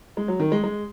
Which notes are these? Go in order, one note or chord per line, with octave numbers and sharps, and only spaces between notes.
G#3
F#3
D#3
G#3
G#3